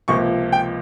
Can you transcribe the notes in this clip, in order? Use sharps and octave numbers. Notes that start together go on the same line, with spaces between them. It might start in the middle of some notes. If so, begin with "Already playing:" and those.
C#2 C3 F3 A#3 C#6
G5